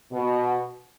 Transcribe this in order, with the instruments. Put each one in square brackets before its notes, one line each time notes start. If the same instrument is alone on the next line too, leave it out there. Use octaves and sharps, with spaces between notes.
[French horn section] B2